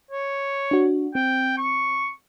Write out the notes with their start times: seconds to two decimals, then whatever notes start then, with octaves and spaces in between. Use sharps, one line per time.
0.11 C#5
0.71 D4 F#4
1.15 C4 G5
1.58 C#6